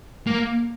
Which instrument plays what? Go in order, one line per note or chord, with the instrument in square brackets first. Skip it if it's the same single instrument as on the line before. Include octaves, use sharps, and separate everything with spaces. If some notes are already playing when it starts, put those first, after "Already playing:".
[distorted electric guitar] A#3